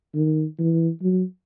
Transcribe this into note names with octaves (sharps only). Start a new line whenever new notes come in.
D#3
E3
F#3